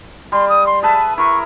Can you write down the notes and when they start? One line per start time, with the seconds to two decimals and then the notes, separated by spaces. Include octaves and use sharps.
0.32 G3 C6
0.49 D#6
0.66 C6
0.83 G#4 B4 E5 A5
1.18 E4 A#4 C#6